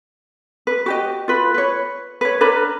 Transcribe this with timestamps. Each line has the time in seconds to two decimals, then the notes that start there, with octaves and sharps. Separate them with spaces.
0.67 B4
0.86 F#4 G4 D#5
1.28 F4 B4
1.54 B4 C#5
2.21 B4 C#5
2.41 D4 A#4 B4 B5